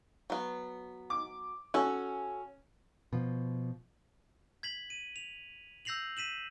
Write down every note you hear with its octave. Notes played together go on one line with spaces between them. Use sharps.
F#3 B3
D6
C#4 F#4 A4
B2 F3
G#6 B6 F#7
D#7
F7
E6 G6 A#6 C7 F7 F#7
B6 D#7 E7 F#7